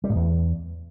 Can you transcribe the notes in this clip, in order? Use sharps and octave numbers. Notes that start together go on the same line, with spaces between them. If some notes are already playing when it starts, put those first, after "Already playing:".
G3
A2
E2